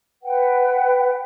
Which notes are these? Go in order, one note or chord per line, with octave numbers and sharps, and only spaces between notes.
B4 F#5 G5